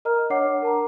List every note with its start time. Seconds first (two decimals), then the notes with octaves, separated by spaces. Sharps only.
0.05 A#4 D#5 A#5 F6
0.30 D4 C#5 F#5 D6 C7
0.63 A#4 A5 A#5